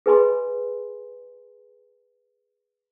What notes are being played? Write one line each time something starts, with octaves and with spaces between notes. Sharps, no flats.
G#4 B4 D#5 G#5 B5 C6